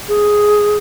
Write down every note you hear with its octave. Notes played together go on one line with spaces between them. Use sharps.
G#4